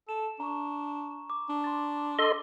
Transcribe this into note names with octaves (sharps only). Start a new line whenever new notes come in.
A4 E7
D4 A#5 C#6
D6
D4
C6 A6
A4 D#5 C6 D6 E6